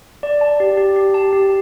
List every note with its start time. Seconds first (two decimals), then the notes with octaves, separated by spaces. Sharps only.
0.23 D5
0.41 A5
0.60 G4
0.77 G4
0.96 G4
1.14 A5
1.33 G4